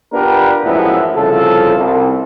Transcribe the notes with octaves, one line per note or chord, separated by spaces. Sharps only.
B3 D4 F4 G4 A#4 B4
A1 F#2 F3 G#3 B3 E4
C2 C#3 F3 F4 A4
C2